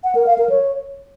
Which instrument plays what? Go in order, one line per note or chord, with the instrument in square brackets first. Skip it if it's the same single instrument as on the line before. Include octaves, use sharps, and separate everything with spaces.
[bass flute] F#5
A#4
F5
A#4
C#5